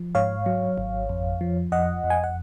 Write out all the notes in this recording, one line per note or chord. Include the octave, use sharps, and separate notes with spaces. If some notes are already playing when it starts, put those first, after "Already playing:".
Already playing: F3
G#2 C#5 F5
F#3
G#1
F2
F3
F2 D#5 F#5
F2
G#5
F#5